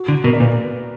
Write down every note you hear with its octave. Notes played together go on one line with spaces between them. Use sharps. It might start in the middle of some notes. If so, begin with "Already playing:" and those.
Already playing: F#4
D3
B2 A#4
D5
A#2 B4